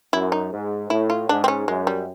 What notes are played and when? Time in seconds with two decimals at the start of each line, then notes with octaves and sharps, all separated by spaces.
0.13 F#2 E4
0.32 D#4
0.51 G#2
0.90 A2 E4
1.10 F4
1.29 G#2 D4
1.44 C4
1.48 C#4
1.68 F#2 G#3
1.87 G3